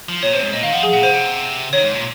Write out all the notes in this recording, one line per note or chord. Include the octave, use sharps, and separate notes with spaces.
F3
A#2 C#5
C3 C5
G#2 C#5
A#2 D#5
D#3 F5
F3 F#5
G#4 G#5
A#2 F#5
C#3 C5
C3
D#3 C#5
G#2
A#2